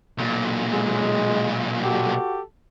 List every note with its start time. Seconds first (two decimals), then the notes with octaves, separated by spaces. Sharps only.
0.18 B1 A#2
0.72 G#3
1.84 F#4 G4 A4